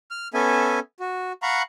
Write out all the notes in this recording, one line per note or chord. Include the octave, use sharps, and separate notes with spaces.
F6
B3 C#4 A4 E5 G#5
F#4
F5 F#5 A#5 B5 C#6 F#6